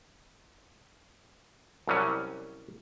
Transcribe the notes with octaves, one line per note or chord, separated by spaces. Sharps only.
C2 F#3 G3 C#4